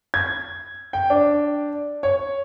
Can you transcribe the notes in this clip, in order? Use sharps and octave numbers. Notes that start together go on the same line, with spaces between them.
G#6
G5
D4
C#5